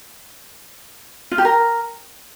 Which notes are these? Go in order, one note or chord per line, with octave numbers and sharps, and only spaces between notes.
F4
G4
A#4